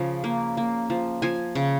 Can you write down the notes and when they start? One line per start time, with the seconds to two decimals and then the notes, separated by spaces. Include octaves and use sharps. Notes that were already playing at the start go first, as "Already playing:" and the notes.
Already playing: C#3 F3
0.24 A#3
0.57 A#3
0.90 F3
1.22 F3 G#5
1.55 C#3